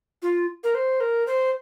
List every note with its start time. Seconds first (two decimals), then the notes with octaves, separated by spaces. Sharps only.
0.22 F4
0.64 A#4
0.75 C5
1.00 A#4
1.27 C5